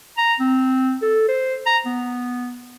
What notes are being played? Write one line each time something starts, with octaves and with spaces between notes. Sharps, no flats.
A#5
C4
A4
C5
A#5
B3